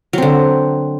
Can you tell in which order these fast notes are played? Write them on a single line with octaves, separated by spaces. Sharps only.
F#3 C4 D3